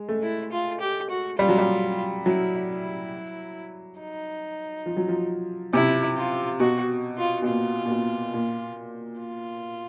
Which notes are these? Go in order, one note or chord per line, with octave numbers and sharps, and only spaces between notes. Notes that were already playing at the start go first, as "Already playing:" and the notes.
Already playing: G#3
A3
E4
F4
G4
F#4
G3 F4
F#3
G3
F#3 E4
E4
D#4
F3
F#3
F3
C3 E4
F4
B2 F#4
F4
B2
A#2 F4
A#2
B2
A#2
F4